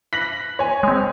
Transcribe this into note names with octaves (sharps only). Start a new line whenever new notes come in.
B5 F#6 A#6 F#7
C#5 G#5
G#3 C4